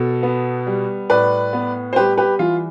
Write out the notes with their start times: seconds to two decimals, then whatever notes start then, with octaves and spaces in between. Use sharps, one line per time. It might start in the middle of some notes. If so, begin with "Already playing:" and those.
Already playing: B2 A4
0.23 B3
0.67 G3
1.10 A2 B4 D5
1.53 B3
1.93 C5
1.96 G3 G4 B4
2.18 G4 B4
2.39 E3 F4